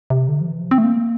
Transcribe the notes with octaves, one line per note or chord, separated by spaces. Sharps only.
C3
D3
F3
E3
F3
C4
A3
A#3